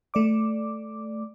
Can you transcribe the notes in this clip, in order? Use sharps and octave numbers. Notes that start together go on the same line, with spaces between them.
A3 D5 D6